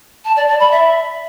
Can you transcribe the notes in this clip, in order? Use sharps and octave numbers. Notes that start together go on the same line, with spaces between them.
A5
D5
D5
B5
E5